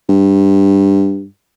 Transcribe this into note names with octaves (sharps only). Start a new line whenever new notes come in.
G2